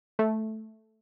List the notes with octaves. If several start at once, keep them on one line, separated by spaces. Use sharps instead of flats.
A3